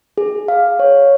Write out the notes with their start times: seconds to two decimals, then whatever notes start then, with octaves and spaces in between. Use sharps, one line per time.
0.18 G#4
0.48 F5
0.79 C#5